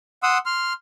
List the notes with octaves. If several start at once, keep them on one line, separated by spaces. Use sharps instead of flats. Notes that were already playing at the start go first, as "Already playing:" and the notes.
F#5 C6 D#6 E6
C6 F6